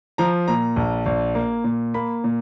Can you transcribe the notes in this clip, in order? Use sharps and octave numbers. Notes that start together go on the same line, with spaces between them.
F3 A#5
A#2 A#5
A#1
A#1
A#3
A#2
A#3 B5
A#2